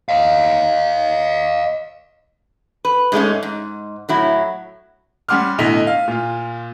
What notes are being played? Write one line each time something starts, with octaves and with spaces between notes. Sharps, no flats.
D#5 F5
B4
G#2 G#3 A3 C#4
G#2
A2 F#3 E4
G3 C#4 F#5 C6 D6 F6
B1 A2 D3 D#5 B6 F7
F5
A#2 F4